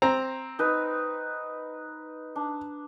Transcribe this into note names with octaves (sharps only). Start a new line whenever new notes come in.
C4 A#5
D#4 B4
D4